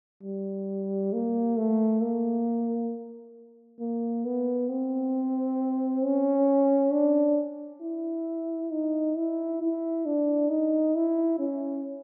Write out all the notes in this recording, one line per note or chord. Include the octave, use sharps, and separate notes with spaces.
G3
A#3
A3
A#3
A#3
B3
C4
C#4
D4
E4
D#4
E4
E4
D4
D#4
E4
C#4